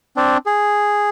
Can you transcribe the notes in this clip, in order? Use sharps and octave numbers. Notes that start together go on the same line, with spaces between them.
C4 D4
G#4